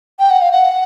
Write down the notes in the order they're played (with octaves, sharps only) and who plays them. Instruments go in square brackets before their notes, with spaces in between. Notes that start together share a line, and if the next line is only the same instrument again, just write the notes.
[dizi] G5
F#5
F5
F#5